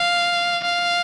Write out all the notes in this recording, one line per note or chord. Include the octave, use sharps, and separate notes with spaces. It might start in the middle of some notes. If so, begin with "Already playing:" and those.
Already playing: F5
F5